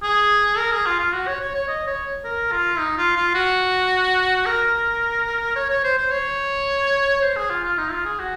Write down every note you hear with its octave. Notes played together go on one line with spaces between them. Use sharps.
G#4
A#4
G#4
F4
F4
F#4
C#5
C#5
C#5
D#5
C#5
A#4
F4
D#4
F4
F4
F#4
A#4
C#5
C#5
C5
C5
C#5
C5
G#4
F4
F4
D#4
F4
G#4
F#4